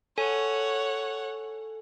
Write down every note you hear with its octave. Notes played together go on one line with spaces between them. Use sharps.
A4 C#5 F#5 G#5